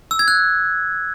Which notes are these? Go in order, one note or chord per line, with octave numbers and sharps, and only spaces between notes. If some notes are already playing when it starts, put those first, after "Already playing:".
E6
G#6
F#6